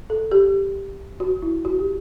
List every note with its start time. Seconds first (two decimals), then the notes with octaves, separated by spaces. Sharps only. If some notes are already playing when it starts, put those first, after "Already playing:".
0.10 A4
0.31 G4
1.20 F#4
1.42 E4
1.65 F#4
1.79 G4